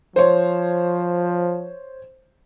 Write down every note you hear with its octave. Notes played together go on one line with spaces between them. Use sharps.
F3 C5 C#5